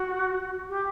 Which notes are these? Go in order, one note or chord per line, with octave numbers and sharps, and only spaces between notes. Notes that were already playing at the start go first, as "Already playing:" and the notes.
Already playing: F#4
G4